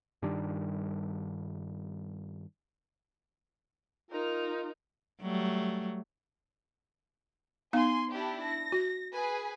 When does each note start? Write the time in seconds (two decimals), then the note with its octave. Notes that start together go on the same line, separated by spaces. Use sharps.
0.22 G2 D#3 G3 D4
4.11 D#4 F4 A#4
5.21 F#3 G3 A3
7.73 B3 D#4 F5 G#5 C6
8.11 D4 E4 G4
8.43 A#6
8.72 F#4
9.13 G#4 B4 G#5